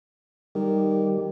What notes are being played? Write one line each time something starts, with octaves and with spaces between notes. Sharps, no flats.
D#3 G3